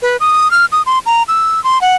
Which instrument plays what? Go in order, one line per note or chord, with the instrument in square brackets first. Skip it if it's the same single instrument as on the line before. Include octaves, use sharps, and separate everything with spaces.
[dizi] B4
D#6
F6
D#6
C6
A#5
E6
C6
F#5